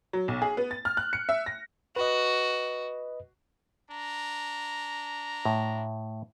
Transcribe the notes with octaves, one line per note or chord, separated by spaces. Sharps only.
F#3
B1
G#4
B3
A6
F6
F#6
C#7
E5
A#6
F#4 B4 D#5
D4 A#5
A2